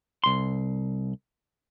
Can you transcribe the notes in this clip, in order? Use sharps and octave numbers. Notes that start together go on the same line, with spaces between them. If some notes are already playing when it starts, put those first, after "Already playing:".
C2 C6